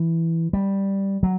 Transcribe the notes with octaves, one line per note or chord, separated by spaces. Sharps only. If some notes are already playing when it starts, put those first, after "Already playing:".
Already playing: E3
G3
F#3